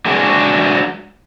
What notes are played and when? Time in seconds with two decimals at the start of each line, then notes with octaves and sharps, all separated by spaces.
0.06 F#3 G#3 D4 F#4 G#4